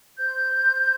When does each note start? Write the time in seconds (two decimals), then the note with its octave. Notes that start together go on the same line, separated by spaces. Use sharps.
0.17 C5 G6
0.53 C5